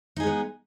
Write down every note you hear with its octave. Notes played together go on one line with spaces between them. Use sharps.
G#3 B3 D#4 G#4